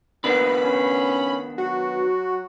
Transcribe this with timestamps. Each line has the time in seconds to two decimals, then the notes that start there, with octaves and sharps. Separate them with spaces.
0.24 D#3 A#3 B3 D4 B5
0.63 C#4
1.58 F#3 F#4